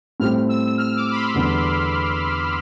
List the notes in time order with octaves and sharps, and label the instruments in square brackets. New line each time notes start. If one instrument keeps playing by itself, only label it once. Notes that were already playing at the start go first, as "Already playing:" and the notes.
[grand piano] A2 G3 C4 G4 [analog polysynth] F6
[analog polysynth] E6
E6
F6
D6
B5
C6
[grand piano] E2 D3 G3 B3